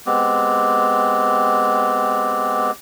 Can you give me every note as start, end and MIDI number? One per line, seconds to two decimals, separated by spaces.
0.06 2.71 56
0.06 2.71 59
0.06 2.71 60
0.06 2.71 67